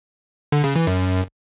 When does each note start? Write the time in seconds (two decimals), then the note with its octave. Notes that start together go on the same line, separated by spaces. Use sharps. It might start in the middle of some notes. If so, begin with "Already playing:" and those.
0.52 D3
0.64 C#3
0.76 E3
0.87 F#2